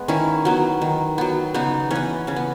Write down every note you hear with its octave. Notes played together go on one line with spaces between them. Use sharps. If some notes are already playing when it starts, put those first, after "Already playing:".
Already playing: G#3 B3
D#3 C#4 E4
F#3 B3
D#3
F#3 B3
C#3 B3 D#4
E3 B3 C#4
C#3 C#4
B3